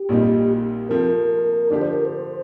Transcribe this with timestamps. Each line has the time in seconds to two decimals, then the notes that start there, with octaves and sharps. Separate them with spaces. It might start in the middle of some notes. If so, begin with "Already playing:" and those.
Already playing: G4
0.09 A#1 A#2 G3 C4 D#4
0.89 C3 F3 A3 C4 A#4
1.70 D3 F3 A3 D4 G4 D5
1.81 C5
1.93 A#4
2.05 C5